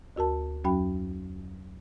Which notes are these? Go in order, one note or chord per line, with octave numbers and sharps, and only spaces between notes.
D2 F#4 A#4 A5
F2 F#3 C#4 F#4 G5 B5